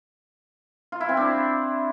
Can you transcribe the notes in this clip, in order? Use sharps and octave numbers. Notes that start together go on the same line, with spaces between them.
F4
E4
C4
D4